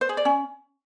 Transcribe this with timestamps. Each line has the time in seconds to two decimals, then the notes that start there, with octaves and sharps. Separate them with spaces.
0.01 C5
0.09 G#4
0.17 D5
0.25 C#4